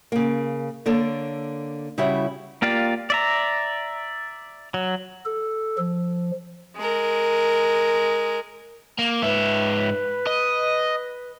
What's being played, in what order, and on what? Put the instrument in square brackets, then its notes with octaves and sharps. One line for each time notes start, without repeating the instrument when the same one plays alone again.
[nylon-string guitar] C#3 A#3
D3 A#3 A4 C#5
C#3 G3 E4 F#4 C#5 E5
[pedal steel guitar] A#3 F4 G4 D5 F5
D5 E5 A#5
F#3
[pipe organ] A4
F3
[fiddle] G#3 A#4
[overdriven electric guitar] A#3
[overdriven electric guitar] G#2 E5 [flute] B4
[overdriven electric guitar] D#5